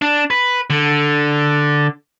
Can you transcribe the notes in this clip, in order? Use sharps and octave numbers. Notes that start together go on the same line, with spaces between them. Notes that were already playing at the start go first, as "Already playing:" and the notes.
D4
B4
D3